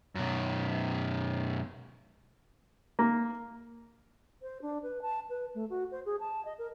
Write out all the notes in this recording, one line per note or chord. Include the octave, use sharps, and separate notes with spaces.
F#2 B2
A#3
C5
D4
B4
A5
B4
A3
F#4
C5
G#4
A5
D#5
A#4